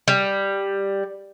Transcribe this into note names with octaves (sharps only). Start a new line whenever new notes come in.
G3